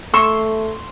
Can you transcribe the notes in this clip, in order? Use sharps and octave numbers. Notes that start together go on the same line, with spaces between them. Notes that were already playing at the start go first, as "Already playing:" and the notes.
A3 C6 C#6 E6